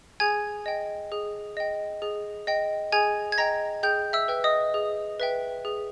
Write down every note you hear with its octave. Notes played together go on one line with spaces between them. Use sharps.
G#4 G#5 G#6
D#5 G5
G#4
D#5 G5
G#4
D#5 G5
G#4 G#5 G#6
G#6
D#5 G5 A#5 A#6
G#4 G5 G6
E5 E6
B4 E5 G5
D#5 D#6
G#4
B4 E5 G5
G#4